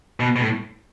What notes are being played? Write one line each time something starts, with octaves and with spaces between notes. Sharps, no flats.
B2
B2
A2